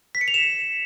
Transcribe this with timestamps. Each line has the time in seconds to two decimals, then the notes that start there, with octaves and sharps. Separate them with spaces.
0.15 B6
0.21 C#7
0.28 F7
0.34 E7